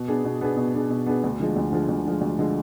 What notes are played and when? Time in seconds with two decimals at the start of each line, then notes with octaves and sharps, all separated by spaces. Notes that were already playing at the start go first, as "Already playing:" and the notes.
Already playing: B2
0.08 B3 D4 G#4
0.25 B2
0.41 B3 D4 G#4
0.57 B2
0.74 B3 D4 G#4
0.90 B2
1.06 B3 D4 G#4
1.24 D2
1.40 D3 F3 G#3
1.56 D2
1.72 D3 F3 G#3
1.89 D2
2.05 D3 F3 G#3
2.21 D2
2.39 D3 F3 G#3